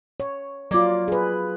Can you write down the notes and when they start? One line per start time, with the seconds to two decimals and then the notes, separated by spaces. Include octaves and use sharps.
0.20 C#5
0.71 F#3 A#3 F4 D5
1.08 G#4 B4